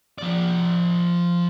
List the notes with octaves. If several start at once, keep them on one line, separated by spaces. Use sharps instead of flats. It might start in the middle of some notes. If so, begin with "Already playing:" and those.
F3 D5